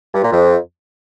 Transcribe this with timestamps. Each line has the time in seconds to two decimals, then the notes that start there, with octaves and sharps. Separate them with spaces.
0.14 G2
0.23 A#2
0.32 F2